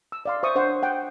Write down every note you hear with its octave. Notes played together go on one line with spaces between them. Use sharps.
E6
D5 F5 C6
C5 E5 C#6 D#6
D4 C5 C#5 F#5
F#5 G5